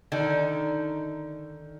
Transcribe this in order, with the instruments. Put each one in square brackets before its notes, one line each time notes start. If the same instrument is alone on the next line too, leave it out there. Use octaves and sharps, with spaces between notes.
[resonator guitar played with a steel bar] D3 D#3 D#4